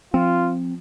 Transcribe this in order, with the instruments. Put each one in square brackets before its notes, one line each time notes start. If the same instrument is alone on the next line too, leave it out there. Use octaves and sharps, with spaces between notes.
[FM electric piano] F3 [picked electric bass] C4 [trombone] F4